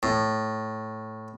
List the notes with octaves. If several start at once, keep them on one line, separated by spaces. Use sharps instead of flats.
A2